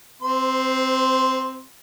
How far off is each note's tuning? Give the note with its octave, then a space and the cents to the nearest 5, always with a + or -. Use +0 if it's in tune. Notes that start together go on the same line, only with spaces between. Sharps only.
C4 +0 C5 -30 C6 +0